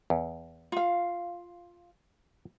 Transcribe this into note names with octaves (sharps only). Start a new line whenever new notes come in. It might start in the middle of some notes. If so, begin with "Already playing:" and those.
E2
F4 F5